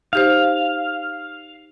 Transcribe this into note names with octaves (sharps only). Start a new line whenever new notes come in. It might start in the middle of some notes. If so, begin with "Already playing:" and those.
D#4 G4 C5 F5